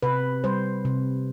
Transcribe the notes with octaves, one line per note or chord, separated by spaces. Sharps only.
C3 B4
G3 C5
C3